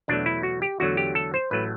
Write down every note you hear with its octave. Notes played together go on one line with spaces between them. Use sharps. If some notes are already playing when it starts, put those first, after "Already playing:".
E2 B2 F#3 A3 D4
E4
F#4
G4
E2 D3 F#3 A3 F#4
G4
A4
C5
A1 A2 F#3 A3 B4